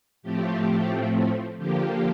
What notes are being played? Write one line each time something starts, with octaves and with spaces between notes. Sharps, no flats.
A2 F3 A3 C4 G4
D3 F3 A#3 G4